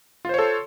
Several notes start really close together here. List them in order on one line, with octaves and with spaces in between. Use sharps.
F4 C5 C#5 A4